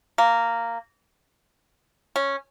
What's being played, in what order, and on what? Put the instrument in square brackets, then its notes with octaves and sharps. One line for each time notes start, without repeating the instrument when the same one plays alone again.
[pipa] A#3
C#4